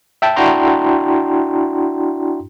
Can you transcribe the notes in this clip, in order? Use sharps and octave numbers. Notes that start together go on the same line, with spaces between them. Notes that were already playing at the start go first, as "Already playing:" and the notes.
E5 G5 A5
D4 E4 F#4 G5 A#5 C6